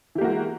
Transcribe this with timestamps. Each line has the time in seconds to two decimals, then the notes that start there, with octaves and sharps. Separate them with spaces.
0.15 E3
0.18 G4
0.21 A#3
0.24 F#4
0.27 G#3